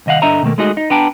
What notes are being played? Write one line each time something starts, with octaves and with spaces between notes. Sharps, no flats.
C2 D#3 D#5 F5 F#5
G2 D3 D4 D#5 E5 A#5
B2 D#3 E3 A3 A#3
G#3 A3 D#4 F#4 G#4 D#5
D#4
B3 D4 G5 A5 A#5